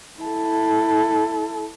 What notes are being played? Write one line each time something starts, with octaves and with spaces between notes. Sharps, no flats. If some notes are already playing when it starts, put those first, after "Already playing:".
E4 A4